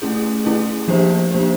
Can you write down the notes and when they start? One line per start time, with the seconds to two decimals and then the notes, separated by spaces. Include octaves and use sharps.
0.02 A3 C#4 E4 G#4
0.45 A3 C#4 E4 G#4
0.88 F3 A#3 D4 G4 C5
1.32 F3 A#3 D4 G4 C5